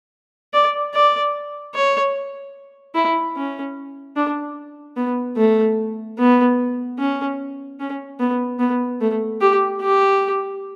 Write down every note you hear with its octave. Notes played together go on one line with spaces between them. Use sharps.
D5
D5
C#5
E4
C#4
D4
B3
A3
B3
C#4
C#4
B3
B3
A3
G4
G4